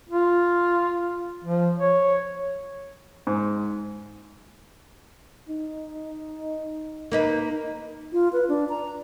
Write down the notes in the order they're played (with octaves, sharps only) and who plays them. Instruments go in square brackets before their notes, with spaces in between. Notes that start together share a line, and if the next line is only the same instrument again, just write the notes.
[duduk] F4
F3
C#5
[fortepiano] G#2
[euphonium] D#4
[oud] A#3 D#4 B4
[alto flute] F4
B4
D4
A#5